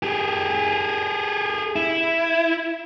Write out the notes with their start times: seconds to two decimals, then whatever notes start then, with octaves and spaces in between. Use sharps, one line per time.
0.03 G4 G#4
1.76 E4